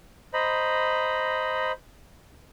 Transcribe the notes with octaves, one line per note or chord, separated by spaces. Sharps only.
C5 D#5 A#5 B5